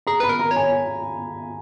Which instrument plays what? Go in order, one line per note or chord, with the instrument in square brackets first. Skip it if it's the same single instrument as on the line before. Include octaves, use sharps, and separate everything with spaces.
[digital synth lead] G#4 [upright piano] A#5
[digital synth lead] B4 [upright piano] B5
[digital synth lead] A#4
[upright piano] A#5
[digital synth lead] C#5
[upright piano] G#5